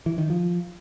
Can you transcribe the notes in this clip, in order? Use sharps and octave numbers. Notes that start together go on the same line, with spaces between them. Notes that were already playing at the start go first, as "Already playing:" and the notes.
E3
D#3
F3